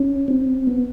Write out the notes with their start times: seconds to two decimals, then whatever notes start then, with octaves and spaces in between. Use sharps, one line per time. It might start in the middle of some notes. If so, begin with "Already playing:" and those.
Already playing: C#4
0.28 C4
0.67 B3